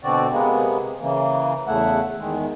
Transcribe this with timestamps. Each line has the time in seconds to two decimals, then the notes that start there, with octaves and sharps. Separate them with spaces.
0.04 B2 D3 C4 F#4 D5
0.31 C3 G#3 A#3 B3
1.00 C#3 E3 A#3
1.67 E2 C#3 A3 E4 F#5
2.19 E2 D#3 G#3